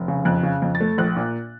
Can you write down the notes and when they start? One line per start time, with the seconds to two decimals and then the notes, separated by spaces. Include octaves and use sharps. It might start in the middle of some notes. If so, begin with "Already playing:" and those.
Already playing: F1
0.08 C#3
0.25 F2 F#6
0.43 C#3
0.62 F2
0.75 A6
0.80 A3
0.98 A#1 F#6
1.16 A#2